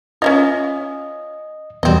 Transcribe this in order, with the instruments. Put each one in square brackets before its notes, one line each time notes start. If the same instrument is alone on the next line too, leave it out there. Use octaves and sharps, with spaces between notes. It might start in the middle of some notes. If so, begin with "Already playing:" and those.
[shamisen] C#4 E4 F4 [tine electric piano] D#5
[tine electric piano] E2 B2 G3 [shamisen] C4 D#5